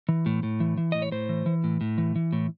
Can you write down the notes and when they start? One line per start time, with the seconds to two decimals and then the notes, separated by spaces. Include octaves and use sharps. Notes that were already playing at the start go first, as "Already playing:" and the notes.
0.09 E3
0.26 A2
0.43 A2
0.60 E3
0.77 E3
0.92 A2 D#5
1.02 C#5
1.12 A2 C5
1.29 E3
1.46 E3
1.64 A2
1.81 A2
1.98 E3
2.16 E3
2.33 A2